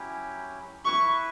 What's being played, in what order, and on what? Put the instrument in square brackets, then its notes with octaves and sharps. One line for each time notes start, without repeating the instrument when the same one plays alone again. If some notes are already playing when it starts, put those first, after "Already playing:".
Already playing: [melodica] F#3 C#4 E4 G4
[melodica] E4 B4 E5 [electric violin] C#6